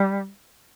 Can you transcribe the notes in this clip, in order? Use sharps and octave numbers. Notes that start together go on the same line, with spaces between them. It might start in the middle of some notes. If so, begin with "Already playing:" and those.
Already playing: G3